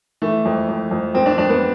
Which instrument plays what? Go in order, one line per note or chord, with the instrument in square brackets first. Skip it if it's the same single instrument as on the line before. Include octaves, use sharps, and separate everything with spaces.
[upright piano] E3 A3
F2
F2
F2
F2 C4
D4
F2 D4
B3